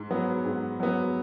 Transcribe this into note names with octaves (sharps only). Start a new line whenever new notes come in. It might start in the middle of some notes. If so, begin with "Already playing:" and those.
Already playing: G#2
F#3 B3
G#2
F#3 B3